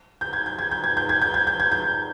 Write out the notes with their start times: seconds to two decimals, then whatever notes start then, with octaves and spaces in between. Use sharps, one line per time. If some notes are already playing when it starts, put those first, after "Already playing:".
0.21 G6
0.33 G#6
0.46 G6
0.59 G#6
0.71 G6
0.84 G#6
0.97 G6
1.09 G#6
1.22 G6
1.34 G#6
1.47 G6
1.60 G#6
1.72 G6